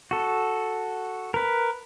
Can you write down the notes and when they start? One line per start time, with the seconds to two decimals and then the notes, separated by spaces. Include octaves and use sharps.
0.11 F#4 A4
1.34 A#4 B4